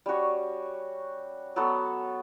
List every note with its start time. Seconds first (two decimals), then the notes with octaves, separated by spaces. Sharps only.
0.06 G3 C#4 F#4 C#5
1.56 F#3 B3 F#4 A4